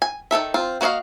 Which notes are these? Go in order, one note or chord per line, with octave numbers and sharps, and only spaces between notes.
G#5
D#3 C4 A4 E5
C4 F4
A#3 F#4 C#5 D#5 F5